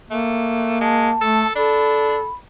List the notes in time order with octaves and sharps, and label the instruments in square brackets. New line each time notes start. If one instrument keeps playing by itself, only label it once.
[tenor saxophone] A3 [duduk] A#3
[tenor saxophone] G#3 [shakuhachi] A5
[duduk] A3 [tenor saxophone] A4
[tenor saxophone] D4 [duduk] A4 [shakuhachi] B5